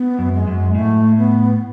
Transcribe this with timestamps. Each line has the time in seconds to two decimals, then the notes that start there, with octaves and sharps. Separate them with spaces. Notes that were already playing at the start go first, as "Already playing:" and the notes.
Already playing: B3
0.19 F#2
0.33 G#3
0.47 F#2
0.75 A2 A3
1.17 B3